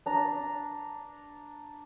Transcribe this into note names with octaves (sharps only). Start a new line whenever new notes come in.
D4 A#5